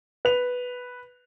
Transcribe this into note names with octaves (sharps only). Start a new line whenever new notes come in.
B4 F7